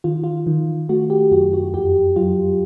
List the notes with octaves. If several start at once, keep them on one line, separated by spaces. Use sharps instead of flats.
D#3 F4
F4
D#3
A3 F#4
G4
F#2 F#4
F#4
F2 G4
F#3 F4